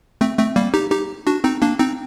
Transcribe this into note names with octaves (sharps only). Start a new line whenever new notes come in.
A3 C4
A3 C4
G3 A#3
D#4 G4
D#4 G4
D4 F#4
C4 D#4
A#3 D4
C4 D#4